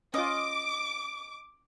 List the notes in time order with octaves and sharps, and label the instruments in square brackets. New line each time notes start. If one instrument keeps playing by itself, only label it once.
[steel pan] C#4 F4 [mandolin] D#5 [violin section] D6